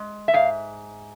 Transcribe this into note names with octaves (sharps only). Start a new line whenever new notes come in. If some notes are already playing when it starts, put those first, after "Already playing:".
Already playing: G#3
E5
G#2 F5